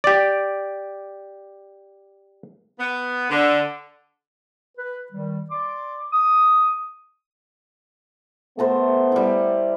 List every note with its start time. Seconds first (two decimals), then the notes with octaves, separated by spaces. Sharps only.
0.04 G4 D5
2.79 B3
3.30 D3
4.77 B4
5.12 D#3 G3
5.50 D5 C6 D6
6.12 D#6
8.59 A3 B3 A4 A#4 C5
9.12 G3 E4